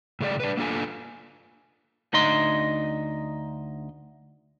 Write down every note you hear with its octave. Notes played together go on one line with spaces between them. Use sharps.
A2 C#3 G#3 A3 D5 G5
D4 B4
A#3 D4 F4 A4 G#5
D2 D#4 D#5 C6